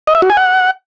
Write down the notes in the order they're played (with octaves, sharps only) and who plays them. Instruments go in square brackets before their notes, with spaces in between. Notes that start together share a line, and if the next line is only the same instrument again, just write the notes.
[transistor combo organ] D#5
E5
F#4
G#5
F#5